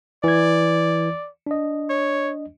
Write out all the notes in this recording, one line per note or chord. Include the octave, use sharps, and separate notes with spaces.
E3 D5 G#6
D4 D#5
C#5